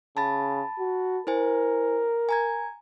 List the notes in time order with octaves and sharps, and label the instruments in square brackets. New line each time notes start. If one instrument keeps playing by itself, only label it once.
[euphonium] C#3 [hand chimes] A5 B5 A6
[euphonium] F#4
[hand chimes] E4 C5 G#5 [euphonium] A#4
[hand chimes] G#5 A#5 G#6